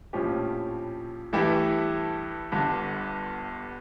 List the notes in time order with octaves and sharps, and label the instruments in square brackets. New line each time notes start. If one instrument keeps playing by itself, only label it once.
[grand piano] A#1 A2 F3 C#4 G4
G2 E3 A3 E4 G4
G1 G2 D3